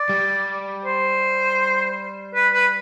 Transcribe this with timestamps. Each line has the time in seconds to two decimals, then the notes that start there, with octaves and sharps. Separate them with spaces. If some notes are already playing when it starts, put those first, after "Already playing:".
Already playing: D5
0.09 G3
0.85 C5
2.35 B4
2.54 B4